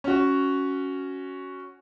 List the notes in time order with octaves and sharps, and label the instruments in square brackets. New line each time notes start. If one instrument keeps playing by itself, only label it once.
[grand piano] C#4 F#4